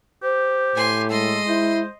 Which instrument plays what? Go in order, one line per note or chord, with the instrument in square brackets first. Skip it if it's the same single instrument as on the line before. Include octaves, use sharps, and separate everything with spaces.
[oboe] G4 [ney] C5
[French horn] A2 [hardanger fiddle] G#5 C6
[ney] G#3 [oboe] A4 [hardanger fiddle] D#5 C6
[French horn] E4 [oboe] C5